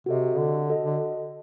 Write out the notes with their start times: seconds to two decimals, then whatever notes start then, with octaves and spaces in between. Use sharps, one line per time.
0.06 C3 F#4 A4 D#5
0.38 D3
0.70 F#4 A4 D#5
0.85 D3